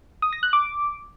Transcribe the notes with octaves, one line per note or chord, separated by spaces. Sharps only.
D#6
A#6
F#6
D6